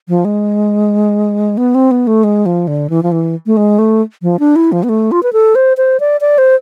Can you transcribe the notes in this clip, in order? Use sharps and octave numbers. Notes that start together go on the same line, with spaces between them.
F3
G#3
B3
C4
B3
A3
G#3
F3
D3
E3
F3
E3
A3
G#3
A3
F3
D4
E4
F3
B3
A3
F4
B4
A4
C5
C5
D5
D5
C5